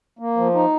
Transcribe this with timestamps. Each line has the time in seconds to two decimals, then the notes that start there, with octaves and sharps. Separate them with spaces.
0.19 A#3
0.37 F3
0.54 D#4